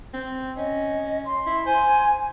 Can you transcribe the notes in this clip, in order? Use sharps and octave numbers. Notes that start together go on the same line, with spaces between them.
C4
C#4 D#5
C6
E4
C5 G#5